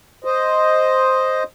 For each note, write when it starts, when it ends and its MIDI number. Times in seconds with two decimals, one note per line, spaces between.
0.25 1.43 72
0.25 1.43 75